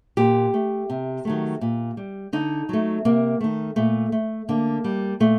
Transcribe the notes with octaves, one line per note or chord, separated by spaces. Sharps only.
A#2 G4
A3
C3
D#3 F#3 A3
A#2
G3
D3 D#4
F#3 A3
C3 A#3
D#3 A3
A#2 A3
A3
D3 A#3
G3
A#2 A3